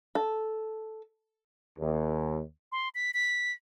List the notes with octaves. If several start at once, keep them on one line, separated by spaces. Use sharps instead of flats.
A4
D#2
C6
B6
B6